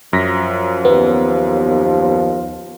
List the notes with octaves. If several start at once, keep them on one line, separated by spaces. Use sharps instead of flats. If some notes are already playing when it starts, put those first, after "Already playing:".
F#2 F3 A#6 B6
D#2 B3